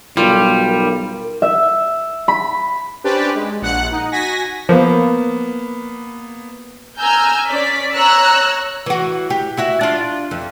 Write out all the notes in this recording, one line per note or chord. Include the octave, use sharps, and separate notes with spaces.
B1 G3 F4 A#4
E5
B5
C#4 D4 G4 B4 C5 D5
G#3
A#1 F#5 F#6 C#7
D#4
F#4 G#5 A#6 B6
F3 A#3 B3
G#5 A#5 E6 F6 G6
C#4 D5 B6
C#5 A#5 E6 F#6
E3 F#4
G4
E4 F#4 E5
D4 F4
F2